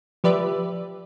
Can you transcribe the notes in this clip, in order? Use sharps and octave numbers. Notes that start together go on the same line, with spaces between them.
F3 G4 B4 D5 E5